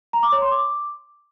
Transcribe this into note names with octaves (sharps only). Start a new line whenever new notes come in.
A#5
D6
C#5
C6
D6